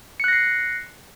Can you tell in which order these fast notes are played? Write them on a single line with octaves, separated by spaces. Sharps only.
C#7 F#6 A#6 C7